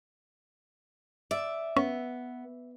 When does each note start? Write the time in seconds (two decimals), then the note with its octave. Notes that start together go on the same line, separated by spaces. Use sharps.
1.31 D5 E5
1.77 B3 C#4